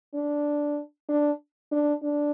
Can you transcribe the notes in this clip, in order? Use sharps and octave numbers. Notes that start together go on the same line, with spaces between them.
D4
D4
D4
D4